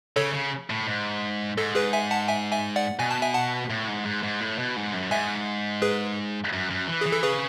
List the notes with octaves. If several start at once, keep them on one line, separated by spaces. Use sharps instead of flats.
C#3 A4 C#5
C#3
A2
G#2
G#2 A4
G#4 B4
E5 G#5
F#5 A5
E5 G#5
E5 G#5
D5 F#5
B2 G#5
A5
E5 G#5
F#5 A5
A2
G#2
G#2
G#2
A2
B2
G#2
F#2
G#2 E5 G#5
G#4 B4
F#2
F#2
E3
G#4
E3
A4
C#3 G#4 B4